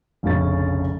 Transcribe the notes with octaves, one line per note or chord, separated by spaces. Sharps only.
F1 A#1 F2 C#3 C#4 A6